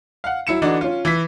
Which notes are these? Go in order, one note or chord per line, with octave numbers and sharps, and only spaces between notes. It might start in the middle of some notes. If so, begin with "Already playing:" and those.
F5 F#5
F#3 E4 C#7 E7
D3 E3 D4 D#4 F#4
C#4 F4
E3 B6